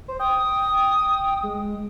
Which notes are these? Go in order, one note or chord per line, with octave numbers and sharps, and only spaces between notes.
C5
G5 D#6
G#3